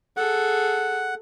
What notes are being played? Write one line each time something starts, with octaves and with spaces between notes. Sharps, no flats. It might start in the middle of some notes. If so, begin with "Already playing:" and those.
G#4 A4 F#5